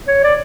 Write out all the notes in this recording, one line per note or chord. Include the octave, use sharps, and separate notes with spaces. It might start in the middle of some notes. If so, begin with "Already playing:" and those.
C#5
D5